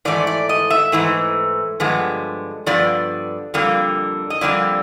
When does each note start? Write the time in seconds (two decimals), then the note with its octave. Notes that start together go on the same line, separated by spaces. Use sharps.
0.05 G#2 E3 A3 D5
0.27 D5
0.49 D#5
0.70 E5
0.92 G#2 E3 A3
1.80 G2 D3 F3 G#3 B3
2.66 G2 D3 F3 B3 D5
3.54 F2 D3 G3 A#3
4.30 D#5
4.41 F2 D3 G3 A#3 D5